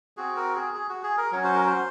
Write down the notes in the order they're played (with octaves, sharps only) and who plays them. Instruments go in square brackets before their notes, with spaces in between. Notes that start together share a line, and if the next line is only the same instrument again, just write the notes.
[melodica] C4 F#4 G#4
A#4
G#4
G#4
F#4
G#4
A#4
F#3 C#4 F#4 C#5
C5
A#4
C5